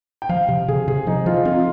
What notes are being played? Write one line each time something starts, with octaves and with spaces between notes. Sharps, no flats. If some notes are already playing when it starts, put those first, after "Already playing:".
G5
F3 F5
C3
C3 G#4
C3 G#4
F3 D#4
F3 F4
C4 F4